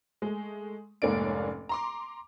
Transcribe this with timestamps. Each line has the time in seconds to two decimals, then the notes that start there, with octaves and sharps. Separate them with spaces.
0.22 G#3 A3
1.02 F1 G#2 A#3 C#4 D5 D7
1.69 A#5 C6 D6